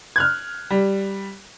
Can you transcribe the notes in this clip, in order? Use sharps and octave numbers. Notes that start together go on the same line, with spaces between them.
F6 F#6 G#6
G3